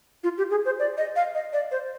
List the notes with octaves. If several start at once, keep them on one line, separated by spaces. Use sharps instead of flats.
F4
G4
G#4
C5
D5
D#5
F5
D#5
D5
C5